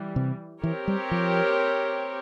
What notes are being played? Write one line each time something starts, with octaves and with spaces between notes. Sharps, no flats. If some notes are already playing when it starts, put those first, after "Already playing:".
Already playing: E3 G3
C3
E3 C4 G4 A#4 C#5
G3
F3